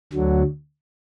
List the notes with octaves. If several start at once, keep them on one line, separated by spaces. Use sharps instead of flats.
D2 D3 F#3